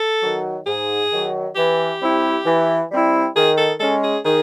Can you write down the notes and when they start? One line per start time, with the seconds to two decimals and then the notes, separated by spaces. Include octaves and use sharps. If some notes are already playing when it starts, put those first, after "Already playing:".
Already playing: A4
0.22 D#3 F#3
0.66 G#2 G#4
1.12 D#3 F#3
1.56 E3 G4
2.02 G3 C4 E4
2.45 E3
2.91 G3 C4 E4
3.36 D#3 G#4
3.58 A4
3.80 G#3 C#4 A4
4.03 G#4
4.25 D#3 G#4